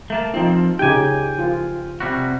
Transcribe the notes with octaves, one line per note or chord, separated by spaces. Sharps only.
A3 A#3 A5
F3 C4 D#4 F4
C#3 D#4 G4 G5 G#5
F4
C3 G3 F#4